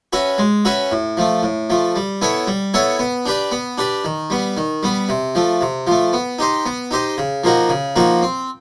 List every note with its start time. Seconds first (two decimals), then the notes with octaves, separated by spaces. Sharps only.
0.13 C#4 F#4 B4 E5
0.38 G#3
0.65 C#4 F#4 B4 E5
0.92 A2
1.17 F3 A3
1.43 A2
1.70 F3 A3
1.96 G3
2.22 B3 E4 A4 C#5
2.47 G3
2.74 B3 E4 A4 C#5
2.99 B3
3.26 D4 G4 B4 D5
3.52 B3
3.78 D4 G4 B4 D5
4.04 D#3
4.30 G3 B3
4.57 D#3
4.83 G3 B3
5.09 C3
5.35 F3 A3
5.61 C3
5.87 F3 A3
6.13 B3
6.39 D#4 G4 C5 D#5
6.66 B3
6.91 D#4 G4 C5 D#5
7.18 C#3
7.44 F3 A#3 D#4 F#4
7.69 C#3
7.96 F3 A#3 D#4 F#4
8.22 C4